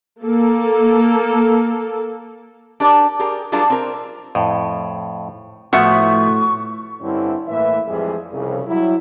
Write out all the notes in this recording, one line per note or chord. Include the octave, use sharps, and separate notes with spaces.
A#3 A4
D4 G4 A#4 D5
G4 G#4 A#4
F#3 G3 D4 F4 G#4 A#4
C4 A#4
F2 A2
A2 F3 A3 B3 F#4 E5 F#5 C#6
G2 D3 C4 C#4 E4
A2 E3 A#3 B4 E5
F2 E3 F3 G3 G#3 G#4
C2 F2 C#3
F#3 G3 E4